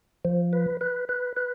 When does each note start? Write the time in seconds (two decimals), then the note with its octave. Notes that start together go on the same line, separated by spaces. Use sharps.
0.25 F3
0.53 B4
0.81 B4
1.09 B4
1.37 B4